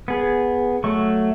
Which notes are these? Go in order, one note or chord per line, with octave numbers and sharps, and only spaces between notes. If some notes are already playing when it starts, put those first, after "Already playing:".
B3 G#4
F#3 A3 C#6